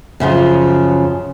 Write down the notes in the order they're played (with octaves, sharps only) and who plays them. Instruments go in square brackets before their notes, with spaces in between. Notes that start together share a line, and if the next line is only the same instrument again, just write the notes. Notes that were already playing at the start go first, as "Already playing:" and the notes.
[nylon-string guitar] F#2 C#3 F3